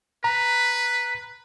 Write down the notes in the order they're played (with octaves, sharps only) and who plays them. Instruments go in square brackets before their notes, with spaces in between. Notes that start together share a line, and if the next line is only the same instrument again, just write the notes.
[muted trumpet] B4 [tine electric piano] A#5